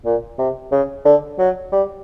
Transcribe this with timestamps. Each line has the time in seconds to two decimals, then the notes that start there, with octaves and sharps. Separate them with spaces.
0.05 A#2
0.38 C3
0.72 C#3
1.05 D3
1.39 F#3
1.72 G3